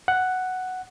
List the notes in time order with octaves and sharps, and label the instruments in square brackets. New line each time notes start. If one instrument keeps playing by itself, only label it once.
[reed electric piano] F#5